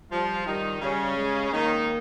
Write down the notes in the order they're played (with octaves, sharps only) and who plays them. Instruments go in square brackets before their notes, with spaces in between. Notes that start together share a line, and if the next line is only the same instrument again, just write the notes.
[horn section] F3 F4 [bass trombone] G3
[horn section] D#3 D#4 [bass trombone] G3
[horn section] C#3 C#4 [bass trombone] G3
[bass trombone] G#3
[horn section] D#3 D#4 [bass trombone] A#3